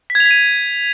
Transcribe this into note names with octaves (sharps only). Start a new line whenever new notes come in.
B6
G#6
F7
B6
D#7